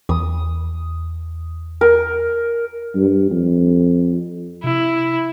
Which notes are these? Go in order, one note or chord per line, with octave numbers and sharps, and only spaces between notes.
E2 D#6
A#4
G2
F2
C3 E4